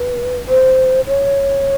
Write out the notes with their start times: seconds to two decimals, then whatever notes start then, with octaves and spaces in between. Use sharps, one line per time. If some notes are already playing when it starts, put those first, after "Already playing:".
Already playing: B4
0.48 C5
1.07 C#5